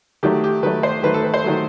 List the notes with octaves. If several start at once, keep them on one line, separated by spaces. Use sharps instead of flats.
D#3 F#3 A3 G4
G4
D#3 F#3 A3 B4
C5
D#3 F#3 A3 B4
A4
B4
C5
D#3 F#3 A3